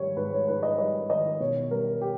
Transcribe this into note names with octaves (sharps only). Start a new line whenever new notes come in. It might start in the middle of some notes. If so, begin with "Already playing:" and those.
Already playing: G#2 D#3 G3 C#5
G#2 B4
C#5
G#2 B4
D#5
G3 D#5
D#3 D#5
B2 C#5
G3 A#4
G4